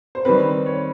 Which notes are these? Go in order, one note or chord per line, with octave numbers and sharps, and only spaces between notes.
C5
D#3 G3 C4 B4
C#5